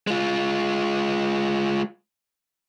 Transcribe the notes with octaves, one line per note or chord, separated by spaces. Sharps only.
G#3 F4